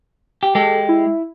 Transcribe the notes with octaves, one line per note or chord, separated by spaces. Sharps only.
G4
G#3 G4 A4
E4